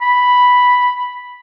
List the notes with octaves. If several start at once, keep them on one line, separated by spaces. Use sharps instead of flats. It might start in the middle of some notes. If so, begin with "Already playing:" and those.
B5